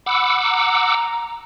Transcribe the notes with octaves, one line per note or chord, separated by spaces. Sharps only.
F#5 B5 D6 E6
A#5